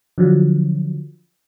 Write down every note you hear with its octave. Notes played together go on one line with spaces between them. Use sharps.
D3 F3 F#3